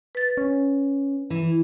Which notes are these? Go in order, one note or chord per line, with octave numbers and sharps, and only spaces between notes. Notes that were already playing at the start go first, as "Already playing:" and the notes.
B4 A6
C#4
E3